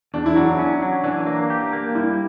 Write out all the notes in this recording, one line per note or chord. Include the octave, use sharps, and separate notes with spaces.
E2 D4
E4
F#3 D4
C#4
F#3
E3 D4
A#3
G4
A#3
G3 E4